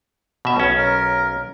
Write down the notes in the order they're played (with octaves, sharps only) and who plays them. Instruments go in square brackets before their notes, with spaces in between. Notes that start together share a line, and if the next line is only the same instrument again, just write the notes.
[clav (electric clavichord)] B2 E5
B1 C#4
[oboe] A#4